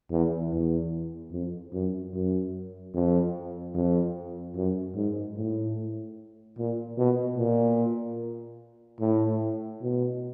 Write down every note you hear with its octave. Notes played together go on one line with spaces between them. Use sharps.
E2
E2
F2
F#2
F#2
F2
F2
F#2
G#2
A2
A#2
B2
A#2
A2
B2